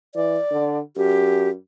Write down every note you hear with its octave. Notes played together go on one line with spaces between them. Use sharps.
E3 D5
D3
F#2 G4